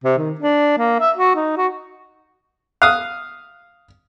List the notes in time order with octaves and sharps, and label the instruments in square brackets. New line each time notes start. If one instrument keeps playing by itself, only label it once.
[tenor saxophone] C3
D#3
D4
A#3
E5
F#4
D#4
F#4
[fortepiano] F5 D#6 [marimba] F#6